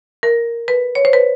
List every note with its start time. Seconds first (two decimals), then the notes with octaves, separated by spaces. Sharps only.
0.23 A#4
0.68 B4
0.95 C#5
1.05 C5
1.13 B4